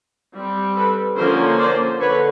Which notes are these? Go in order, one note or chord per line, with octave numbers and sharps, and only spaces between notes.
G3 C4
A4 B4
D3 F3 A#3 C#4 A#4 C5
C5 D5
D3 B4 C#5